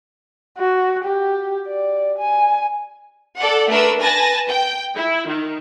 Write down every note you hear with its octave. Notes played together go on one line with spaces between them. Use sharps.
F#4
G4
D5
G#5
A4 D5 F#5
A3 D4 A#4 B4 E6
B4 G#5 A5 A6 A#6
G5
E4
D#3